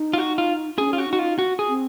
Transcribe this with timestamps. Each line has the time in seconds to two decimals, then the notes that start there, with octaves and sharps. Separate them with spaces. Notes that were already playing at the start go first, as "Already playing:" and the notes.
Already playing: D#4
0.13 F4
0.18 F#4
0.38 F4
0.78 C#4 G#4
0.93 F4
0.98 F#4
1.09 D#4 F#4
1.19 F4
1.39 F#4
1.59 G#4
1.69 C4